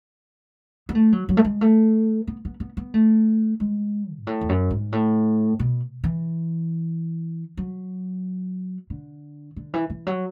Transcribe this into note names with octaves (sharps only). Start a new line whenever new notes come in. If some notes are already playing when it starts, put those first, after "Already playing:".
B3
A3
F#3
F#3
A3
G#3
A3
B3
B3
B3
B3
A3
G#3
G#2
A2
E2
F#2
G#2
A2
B2
E3
F#3
D3
D3
E3
E3
F#3